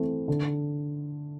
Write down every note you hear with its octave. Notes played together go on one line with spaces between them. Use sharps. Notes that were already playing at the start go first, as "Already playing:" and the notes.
Already playing: E3 A3 C4
D3